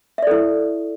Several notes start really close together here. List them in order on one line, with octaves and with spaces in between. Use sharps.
E5 D5 A4 E4